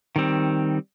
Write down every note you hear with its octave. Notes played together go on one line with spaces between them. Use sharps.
D#3 G3 C4